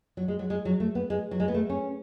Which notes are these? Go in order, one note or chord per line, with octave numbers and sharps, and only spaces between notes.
F#3
G#3
F#3
G#3
F#3
A3
B3
G#3
F#3
G#3
B3
A3
C#4